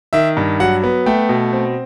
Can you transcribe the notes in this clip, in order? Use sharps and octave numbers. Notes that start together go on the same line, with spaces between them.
D#3 E5
G2
F#3 F#5
B3
A3 G5
B2
C4